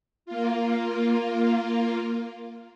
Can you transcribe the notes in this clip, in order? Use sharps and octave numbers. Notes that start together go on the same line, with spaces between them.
A#3 F4